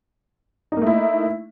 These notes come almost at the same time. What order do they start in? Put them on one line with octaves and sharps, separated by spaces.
D#4 A#3 A3 E4